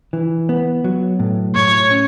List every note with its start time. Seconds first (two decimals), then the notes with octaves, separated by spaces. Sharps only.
0.13 E3
0.49 B3
0.84 F#3
1.19 A2
1.55 A2 C#5
1.91 C#4